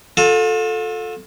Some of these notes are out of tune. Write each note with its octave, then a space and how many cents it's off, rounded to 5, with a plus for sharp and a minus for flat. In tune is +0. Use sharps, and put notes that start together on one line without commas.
F4 +40 A4 +0